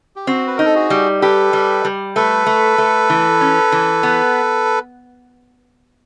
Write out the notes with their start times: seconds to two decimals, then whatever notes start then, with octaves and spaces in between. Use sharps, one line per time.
0.16 G4
0.27 C4 F#4
0.47 B4
0.56 D#4 A#4
0.65 A4
0.75 F#4 G#4
0.90 G3
1.21 G4 A4 B4
1.53 G3
1.85 G3
2.16 A3 A4 B4
2.46 A3
2.78 A3
3.10 E3
3.41 C#4
3.72 E3
4.03 B3